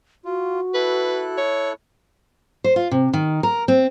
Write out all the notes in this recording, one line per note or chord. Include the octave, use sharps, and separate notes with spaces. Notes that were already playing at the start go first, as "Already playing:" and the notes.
F4 F#4
E4 A4 B4 F#6
C#5
C5
F4
C3
D#3
A#4
C4